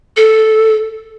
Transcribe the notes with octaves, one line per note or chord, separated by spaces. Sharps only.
A4